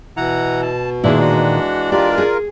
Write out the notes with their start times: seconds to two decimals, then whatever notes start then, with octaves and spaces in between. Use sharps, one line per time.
0.17 B2 E3 F#5 A#5
0.62 A5
1.04 A#2 D#3 E3 G#3 D4 E4 G#4
1.21 F#4
1.92 F4 G4 A#4 D5
2.18 G#4